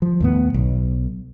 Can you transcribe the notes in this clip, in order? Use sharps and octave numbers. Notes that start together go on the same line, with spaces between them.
F3
D#2 A2 B3
B1